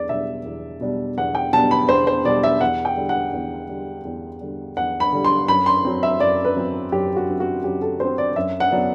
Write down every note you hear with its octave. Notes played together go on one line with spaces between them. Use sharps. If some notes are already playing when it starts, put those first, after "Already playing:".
Already playing: E2 D5
B2 G3 D4 E5
E2
B2 G3 D4
E2 F#5
G5
B2 G3 D4 A5
B5
E2 C5
C5
B2 G3 D4 D5
E5
E2 F#5
G5
D3 G3
F#5
E2
D3 G3
E2
D3 G3
E2 F#5
B5
D3 G3
C6
F#2 B5
C6
F#3 C4
E5
F#2 D5
B4
F#3 C4
F#2 G4
F#4
F#3 C4
F#4
F#2 G4
A4
F#3 C4 C5
D5
F#2 E5
F#5
F#3 B3 D4